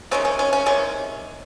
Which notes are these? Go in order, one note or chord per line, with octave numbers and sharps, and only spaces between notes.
C3 D#3 G#3 C#4
C#4
C#4
C#4
C3 D#3 G#3 C#4